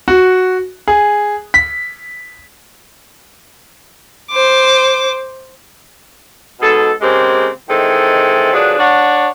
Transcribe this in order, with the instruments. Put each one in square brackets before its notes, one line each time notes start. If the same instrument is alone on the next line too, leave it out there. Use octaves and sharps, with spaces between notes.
[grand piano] F#4
G#4
B6
[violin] C5 D6
[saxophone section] G#2 B2 G#4 A4
C#3 G#3 A#3 C4 G4
D#3 E3 G#3 C4 A4
D3 F3 F#3 D4 G#4 B4
D4 C#5 F#5